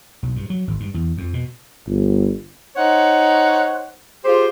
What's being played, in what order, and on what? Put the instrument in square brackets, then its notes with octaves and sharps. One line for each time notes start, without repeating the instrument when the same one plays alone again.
[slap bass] B1
G2
F#3
G#1
G2
E2
F2
B2
[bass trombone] G1
[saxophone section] D#4 C5 C#5 F#5
F4 G4 G#4 C5